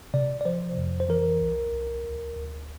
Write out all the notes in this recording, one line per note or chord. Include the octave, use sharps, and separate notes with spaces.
C3 D5
D5
F3 C5
F2
C5
E3 A#4
C2
C2
D2
D2